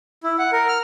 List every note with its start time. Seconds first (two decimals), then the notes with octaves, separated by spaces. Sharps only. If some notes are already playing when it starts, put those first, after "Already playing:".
0.24 E4
0.39 F#5
0.52 A#4
0.68 F6